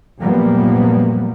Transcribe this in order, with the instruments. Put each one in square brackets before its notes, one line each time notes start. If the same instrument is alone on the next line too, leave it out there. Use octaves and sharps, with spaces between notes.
[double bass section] F#2 A#2 F3 G3 A#3 B3